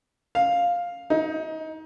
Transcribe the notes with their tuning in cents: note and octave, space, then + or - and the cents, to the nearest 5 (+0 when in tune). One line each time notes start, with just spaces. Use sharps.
F5 +5
D#4 +25